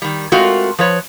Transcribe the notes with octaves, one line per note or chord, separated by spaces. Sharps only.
D#3 G3
G#3 A3 C4 F4 F#4 A#4
F3 B4 C#5